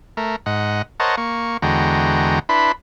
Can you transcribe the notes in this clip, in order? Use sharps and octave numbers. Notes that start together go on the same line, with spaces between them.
A3 A#4
G#2 D#5 F#5
A#4 C5 C#5 D#5 F#5 A5
A#3 C#6
E2 D3 G#3 F#4 G5 A#5
D4 E4 B4 B5 C6